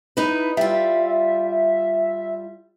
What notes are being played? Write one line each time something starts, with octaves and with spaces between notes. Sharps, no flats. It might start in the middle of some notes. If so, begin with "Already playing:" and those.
D#4 E4 B4
G3 F4 E5